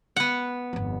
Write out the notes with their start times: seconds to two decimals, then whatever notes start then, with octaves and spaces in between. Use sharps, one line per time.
0.16 B3 F#5
0.73 G1 F2